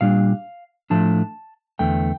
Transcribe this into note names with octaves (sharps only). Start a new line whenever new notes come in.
A#2 G3 D4 F5
A2 F3 A3 D4 A5
E2 D3 A3 G5